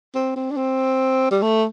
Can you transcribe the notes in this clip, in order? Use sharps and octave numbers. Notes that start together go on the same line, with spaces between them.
C4
C4
D4
C4
G3
A3